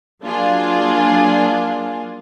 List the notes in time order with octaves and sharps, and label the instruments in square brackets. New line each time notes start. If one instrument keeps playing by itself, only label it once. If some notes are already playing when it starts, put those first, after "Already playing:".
[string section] F#3 A#3 D4 F4 G#4